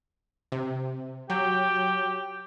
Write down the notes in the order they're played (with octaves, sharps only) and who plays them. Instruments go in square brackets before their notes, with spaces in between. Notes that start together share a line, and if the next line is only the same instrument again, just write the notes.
[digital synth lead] C3
[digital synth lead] F#3 [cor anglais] G4 [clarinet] G5